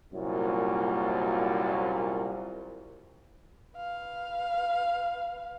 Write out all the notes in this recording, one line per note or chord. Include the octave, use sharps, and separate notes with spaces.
C2 F#2 A#2
B4 F5